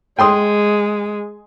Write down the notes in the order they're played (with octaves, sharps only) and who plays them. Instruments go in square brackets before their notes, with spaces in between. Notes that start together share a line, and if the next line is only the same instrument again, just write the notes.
[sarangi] G#3 [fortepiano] G5 C6 D#6